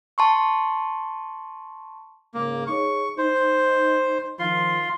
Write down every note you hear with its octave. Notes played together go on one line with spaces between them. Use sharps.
A5 C6 C#6
G#2 C#3 A#3
D#4 G#4 C#5 C#6
D#4 C5
D#3 F3 F4 C6